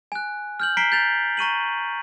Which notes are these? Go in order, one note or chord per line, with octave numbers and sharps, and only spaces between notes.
G#5 F#6
F6 G6 F#7
A#5 B6 C7 D7 G7
G6 A6 F7
A#5 C#6 D#7 F#7